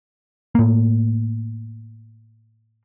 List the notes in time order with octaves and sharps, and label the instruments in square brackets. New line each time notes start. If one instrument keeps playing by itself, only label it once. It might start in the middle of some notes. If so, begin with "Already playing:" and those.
[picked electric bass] A2 A#3